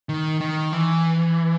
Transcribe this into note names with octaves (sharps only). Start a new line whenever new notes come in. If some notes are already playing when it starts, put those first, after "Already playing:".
D#3
D#3
E3